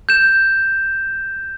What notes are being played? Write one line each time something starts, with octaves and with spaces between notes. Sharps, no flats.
G6 E7